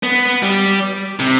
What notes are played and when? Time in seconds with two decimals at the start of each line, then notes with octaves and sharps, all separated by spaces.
0.03 B3
0.43 G3
1.20 C3